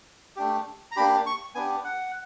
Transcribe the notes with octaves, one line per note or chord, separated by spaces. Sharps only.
A3 D4 G4
A#5
A#3 D4 G4 B5
C#6
B3 D4 G4 G#5
F#5